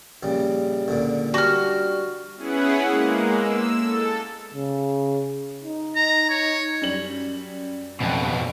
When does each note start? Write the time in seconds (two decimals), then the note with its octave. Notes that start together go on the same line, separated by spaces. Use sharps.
0.23 A#1 C#3 G3
0.88 C#2 A#2 D3
1.34 G3 D4 F#4 F6
2.36 B3 C#4 E4 G#4 B4 F#5
2.88 G#3 A#3
3.35 E6
3.78 A4
4.54 C#3
5.64 D#4
5.96 A#5
6.30 C#5
6.81 F#2 G3 F#7
8.00 F2 B2